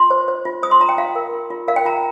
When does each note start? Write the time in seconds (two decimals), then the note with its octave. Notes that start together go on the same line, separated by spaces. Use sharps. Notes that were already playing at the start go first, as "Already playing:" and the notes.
Already playing: F4 C6
0.10 C5
0.28 C5
0.45 F4
0.63 C5 D#6
0.71 C6
0.81 F4 A#5
0.89 G5
0.98 F4 F5
1.15 A#4
1.33 F4
1.50 F4
1.68 A#4 F5
1.76 G5
1.85 F4 A#5